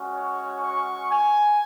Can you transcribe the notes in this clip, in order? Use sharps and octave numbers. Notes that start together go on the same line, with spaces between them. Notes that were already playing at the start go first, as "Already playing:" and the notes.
Already playing: G#3 C#4 F#4
C#5
C#6
G#5